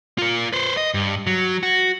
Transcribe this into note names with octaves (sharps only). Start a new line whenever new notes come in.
F4 A#4
B4 C5
D#5
G2
F#3
F#4